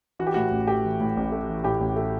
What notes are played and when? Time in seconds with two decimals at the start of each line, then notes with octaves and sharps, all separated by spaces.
0.19 E3 F#4
0.27 G4
0.34 A2 F#4
0.51 A1
0.67 A3 G4
0.84 E3
1.00 A2
1.17 A1
1.32 A3
1.48 E3
1.64 A2 G4
1.80 A1
1.96 A3